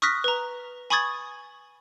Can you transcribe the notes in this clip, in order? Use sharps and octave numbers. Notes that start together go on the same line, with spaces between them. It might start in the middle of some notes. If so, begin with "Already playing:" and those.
C#6 D#6 F6 F#6 A#6 B6
B4 A#5
G#5 B5 C#6 D#6 G#6 A6